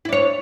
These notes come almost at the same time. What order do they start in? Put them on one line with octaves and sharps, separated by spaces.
E4 D4 C#5